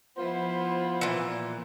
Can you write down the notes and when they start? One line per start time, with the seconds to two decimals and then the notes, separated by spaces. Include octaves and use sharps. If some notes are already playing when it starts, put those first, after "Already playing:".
0.16 F3 B3 E4 F4 C5 C6
1.01 A#2 E3